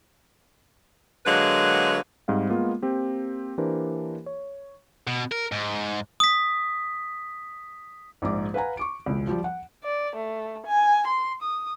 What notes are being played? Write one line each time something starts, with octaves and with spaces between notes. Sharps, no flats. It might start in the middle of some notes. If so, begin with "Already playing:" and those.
D3 F#3 G#3 A#3 B4
G#2 G3 C4 F5
G#3 A#3 B3 F4
A#3 C4 G4
E3 A#3 D4 G4 A#4 C5
C#5
B2
A#4
G#2
D#6 B6
A#1 G#2 D6
B4 F5 F#5 G#5 A#5
C#6 D6 D7
E1 C#2
F3 G3
F#5
D5
A3
G#5
C6
D#6